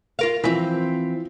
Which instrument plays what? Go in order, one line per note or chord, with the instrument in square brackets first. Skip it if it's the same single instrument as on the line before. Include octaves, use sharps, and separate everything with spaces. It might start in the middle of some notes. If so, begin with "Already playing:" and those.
[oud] F4 A#4 F5
[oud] E3 C4 [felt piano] F3 E4 B6